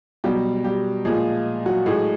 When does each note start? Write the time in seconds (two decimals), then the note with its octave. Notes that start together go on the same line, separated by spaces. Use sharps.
0.24 B2 F#3 G3 G4
0.64 G3 G4
1.05 A#2 F3 G#3 G#4
1.66 F#3 F#4
1.86 A2 F#3 G#3 G#4